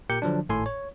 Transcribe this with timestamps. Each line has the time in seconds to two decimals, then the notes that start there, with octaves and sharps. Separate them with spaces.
0.10 A#2 G4 A#4 G6 C#7
0.22 D3 F3 F#3 D4
0.49 G#1 A2 A4 G#5 C6
0.66 C#5